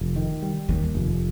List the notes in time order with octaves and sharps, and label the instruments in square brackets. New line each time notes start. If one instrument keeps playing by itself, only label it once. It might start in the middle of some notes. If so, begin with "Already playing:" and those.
Already playing: [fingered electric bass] F1
D#3
G3
[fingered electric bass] D#2 [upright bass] D#3
[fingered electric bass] F1